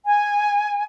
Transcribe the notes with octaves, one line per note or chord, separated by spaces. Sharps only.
G#5